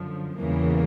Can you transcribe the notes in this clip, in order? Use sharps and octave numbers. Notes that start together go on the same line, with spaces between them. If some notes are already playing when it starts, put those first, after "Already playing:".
Already playing: F#2 D3 F3
E2 C#3 E3 G3 A#3